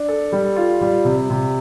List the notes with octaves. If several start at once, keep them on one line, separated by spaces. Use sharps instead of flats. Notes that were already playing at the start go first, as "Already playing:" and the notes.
Already playing: D4
A4
G3
F4
G3
C3
C3